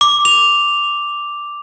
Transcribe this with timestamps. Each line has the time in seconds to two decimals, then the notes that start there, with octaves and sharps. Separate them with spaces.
0.01 D6
0.25 F7